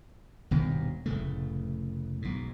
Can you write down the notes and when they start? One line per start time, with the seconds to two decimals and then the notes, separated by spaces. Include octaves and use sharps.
0.51 D#1 G2 B2 D#3
1.06 F1 A2 C#3 A3
2.22 B1 G#2